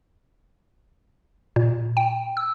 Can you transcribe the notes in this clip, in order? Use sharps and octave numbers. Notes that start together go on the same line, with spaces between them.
A#2
G5
E6